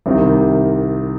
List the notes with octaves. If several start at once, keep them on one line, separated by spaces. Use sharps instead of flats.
C2 C3 D#3